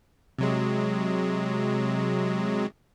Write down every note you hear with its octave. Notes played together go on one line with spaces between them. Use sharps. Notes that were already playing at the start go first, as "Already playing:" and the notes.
C3 F#3 G#3